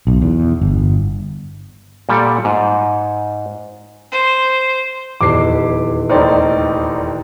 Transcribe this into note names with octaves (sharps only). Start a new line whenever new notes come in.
B1
E2
G1
A#2 G3 A4 D5 F#5
G#2
C5
D#1 E2 D6 B6 C7
F1 D#2 D#4 C5 D5